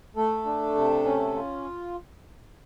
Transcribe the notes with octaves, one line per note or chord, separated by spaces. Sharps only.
A3 A4
D4
C3
C#4
F4